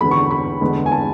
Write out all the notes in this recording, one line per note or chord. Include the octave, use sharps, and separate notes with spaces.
E1 E2 D3 B5
C#6
B5
E2 D3 G#3 B3
G#5
A5